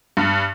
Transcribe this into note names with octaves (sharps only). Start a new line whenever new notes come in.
G2